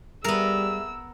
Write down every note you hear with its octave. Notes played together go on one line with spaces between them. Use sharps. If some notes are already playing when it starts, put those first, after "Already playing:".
G3 B3 G#4 A#4 E5 E6